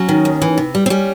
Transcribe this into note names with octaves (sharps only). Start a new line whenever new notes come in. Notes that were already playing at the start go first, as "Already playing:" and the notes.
Already playing: F#3 C#4
D#3
D#2
E3
C3
G3
C4
G3 C#4